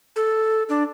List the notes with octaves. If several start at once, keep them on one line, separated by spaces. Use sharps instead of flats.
A4
D4